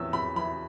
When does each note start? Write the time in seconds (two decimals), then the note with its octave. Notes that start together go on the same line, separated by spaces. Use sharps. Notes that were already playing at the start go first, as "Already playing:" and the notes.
Already playing: E2 C#4 E6
0.13 E2 B5
0.36 E3 B5